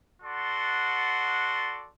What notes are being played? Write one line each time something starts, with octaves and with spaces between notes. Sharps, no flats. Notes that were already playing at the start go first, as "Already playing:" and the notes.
F#4 A4 D5 F#5 C6